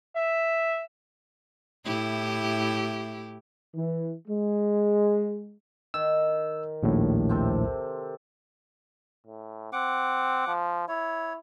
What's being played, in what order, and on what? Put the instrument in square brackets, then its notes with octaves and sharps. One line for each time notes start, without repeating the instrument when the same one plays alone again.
[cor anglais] E5
[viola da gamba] A2 E4 G4
[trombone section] E3
G#3
[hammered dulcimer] D#3 [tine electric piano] E6
[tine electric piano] A#1 D#2 A2
[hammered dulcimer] C3 C4 A4
[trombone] A2
[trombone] C4 [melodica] F#5 D6
[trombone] F3
[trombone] E4 [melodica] C#5